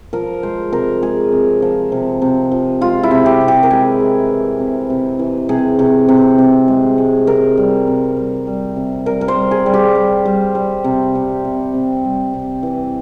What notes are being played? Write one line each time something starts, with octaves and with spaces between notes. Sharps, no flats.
F3 A#4
G#3 C5
C3 A#4
G#3 G#4
C3
F3
C3
C3
F3
G#3 F4
E4
C3
G4
C3
G4
A#4
G#3 G#4
G#3
E3
C3
C3
E3
C3 G#4
C3
C3
C3
G#3
G#3
C3 A#4
G3
C3
G3
G3
C3
G3 A#4
A#4
C5
G3
G#4
G3
G4
G3
G3
G3
C3
C3
C3
C3
G3
C3
E3